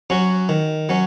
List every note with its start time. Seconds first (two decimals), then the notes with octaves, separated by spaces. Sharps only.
0.10 F#3 C#4 F#4
0.49 D#3
0.89 F#3 C#4